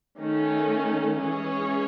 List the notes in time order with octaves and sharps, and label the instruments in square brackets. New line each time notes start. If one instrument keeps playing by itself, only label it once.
[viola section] D#3 A3 C#4
E3 G#3 C#4 G#4 C#5